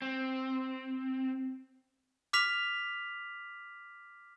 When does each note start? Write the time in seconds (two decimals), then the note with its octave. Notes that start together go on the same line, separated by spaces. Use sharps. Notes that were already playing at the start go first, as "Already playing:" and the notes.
0.02 C4
2.33 D6 F6 B6 F7